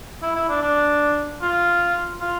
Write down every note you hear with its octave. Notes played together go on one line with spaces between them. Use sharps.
E4
E4
D4
D4
F4
F4